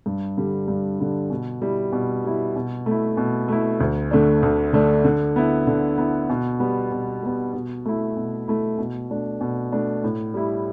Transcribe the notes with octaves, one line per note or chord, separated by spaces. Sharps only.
G2
D3 G3
G2
D3 G3
B2
G3 E4
B2
G3 E4
B2
A3 E4
B2
A3 E4
D2
D3 A3 D4
D2
D3 A3 D4
D3
B3 E4
D3
B3 E4
B2
G3 B3
B2
G3 B3
B2
A3 E4
B2
A3 E4
B2
A3 D4
B2
A3 D4
A2
G3 E4